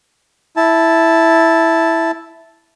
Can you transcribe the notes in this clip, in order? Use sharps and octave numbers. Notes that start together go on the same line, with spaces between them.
E4 A5